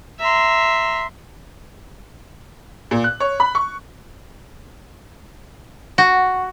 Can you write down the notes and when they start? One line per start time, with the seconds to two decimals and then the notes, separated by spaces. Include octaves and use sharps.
0.19 E5 A#5 C6
2.91 A#2
3.04 F#6
3.20 C#5
3.40 B5
3.55 C#6
5.98 F#4